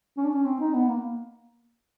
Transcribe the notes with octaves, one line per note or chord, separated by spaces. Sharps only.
C#4
D4
C#4
C4
D#4
B3
A#3